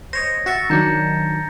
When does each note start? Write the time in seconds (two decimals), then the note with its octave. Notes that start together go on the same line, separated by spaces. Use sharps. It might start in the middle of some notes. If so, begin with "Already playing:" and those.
0.13 C5 C#5 D#5 A#6
0.46 F#4 E5 C#6 A6 A#6
0.70 D#3 F#3 D4 A#5 G6 C#7